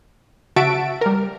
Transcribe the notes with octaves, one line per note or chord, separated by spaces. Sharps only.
C#3 F#4 E5 A5 D7
G3 A#4